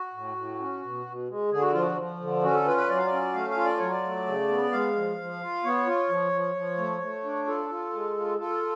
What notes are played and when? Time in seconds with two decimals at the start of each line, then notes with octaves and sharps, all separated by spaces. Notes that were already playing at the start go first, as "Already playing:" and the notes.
Already playing: F#4
0.14 A2
0.36 A2
0.60 C#4
0.82 B2
1.06 B2
1.28 G#3
1.51 D3 G#4
1.61 F#4
1.72 F3 F4
1.82 F#4
1.97 F3
2.20 D3
2.43 C#4 F#4
2.54 A4
2.66 F4 B4
2.77 B4
2.89 F#3 D5
2.97 F5
3.06 D5
3.12 C#4
3.34 A3 F5
3.50 F5
3.57 F4
3.65 D5
3.78 F#3 C#5
3.91 D5
4.03 A3
4.26 C#3
4.49 B3
4.72 G#3 F5
4.96 F3
5.18 F3
5.41 F4
5.64 B3 C#5
5.87 F4
6.09 F3
6.32 F3
6.55 F3
6.78 A3
7.01 A3
7.24 D4
7.47 F4 A4
7.70 F4
7.93 G#3
8.16 F4
8.38 F4 A4